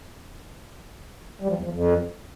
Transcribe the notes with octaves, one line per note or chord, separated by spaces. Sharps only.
G3
F3
E2
F3
F2